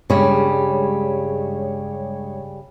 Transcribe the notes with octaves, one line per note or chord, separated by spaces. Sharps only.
G2 C#3 G3 G#3 C#5